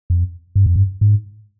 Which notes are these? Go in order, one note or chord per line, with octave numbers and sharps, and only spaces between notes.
F2
G2
F2
G2
G#2